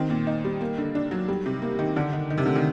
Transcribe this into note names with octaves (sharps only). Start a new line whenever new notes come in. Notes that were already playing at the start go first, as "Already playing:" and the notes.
Already playing: D#3 C4
A#2
D#4
G3
A#3
D3
D4
F#3
G3
C3
A#3
D#3
D3 D4
D#3
D#3
C3
D3 A3
D#3